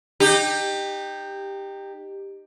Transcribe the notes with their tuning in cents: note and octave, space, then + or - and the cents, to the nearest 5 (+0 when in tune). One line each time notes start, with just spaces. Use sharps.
D#4 -25 G4 +10